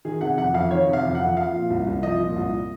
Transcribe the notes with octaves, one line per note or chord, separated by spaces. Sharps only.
D#3 G#4
C3 F#5
F2 F#5
F2 F5
D#3 C#5
C3
F5
F2
F#5
F2
F3 F5
A#2
C2
C2
F3 D#5
A#2
C2